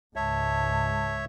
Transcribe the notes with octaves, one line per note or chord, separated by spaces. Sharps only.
C#2 G#2 C#5 E5 A5